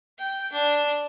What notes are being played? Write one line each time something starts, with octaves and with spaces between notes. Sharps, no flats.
G5
D4